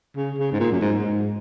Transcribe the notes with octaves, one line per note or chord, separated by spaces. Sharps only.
C#3
C#3
G#2
A#2
F#2
G#2
G#2